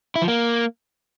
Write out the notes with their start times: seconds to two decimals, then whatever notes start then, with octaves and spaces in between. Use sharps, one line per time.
0.16 E4
0.22 F3
0.28 A#3